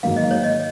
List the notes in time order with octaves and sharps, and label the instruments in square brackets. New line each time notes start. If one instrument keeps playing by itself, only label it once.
[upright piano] G#2 D#3 F#3 A#3 [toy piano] F5
[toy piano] D#5
C#5
D#5